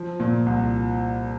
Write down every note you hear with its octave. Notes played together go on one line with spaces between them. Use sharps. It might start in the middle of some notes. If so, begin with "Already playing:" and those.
Already playing: F3
A#2
C2